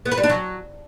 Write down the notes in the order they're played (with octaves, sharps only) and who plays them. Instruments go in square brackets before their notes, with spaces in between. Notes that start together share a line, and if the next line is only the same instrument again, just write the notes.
[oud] B3
B4
G3
D4
F#3